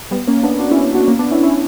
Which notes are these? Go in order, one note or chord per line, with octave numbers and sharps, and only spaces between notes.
G3 B3
A#3 C#4
B3 D4
D4 F#4
C#4 E4
D4 F#4
A#3 C#4
B3 D4
C#4 E4
C#4 E4